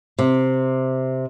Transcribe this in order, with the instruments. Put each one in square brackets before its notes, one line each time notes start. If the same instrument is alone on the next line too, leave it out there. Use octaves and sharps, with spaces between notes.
[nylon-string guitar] C3